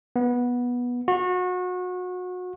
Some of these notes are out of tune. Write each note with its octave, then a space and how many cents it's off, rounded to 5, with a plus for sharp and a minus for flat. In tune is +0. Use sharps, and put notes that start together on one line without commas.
B3 -15
F#4 -30